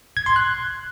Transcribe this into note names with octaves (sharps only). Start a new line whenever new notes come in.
G#6
C6
F#6